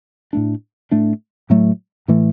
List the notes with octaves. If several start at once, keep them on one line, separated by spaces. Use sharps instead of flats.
A2 A3 D4
A2 A3 D4
A2 F#3 A3
A2 E3 A3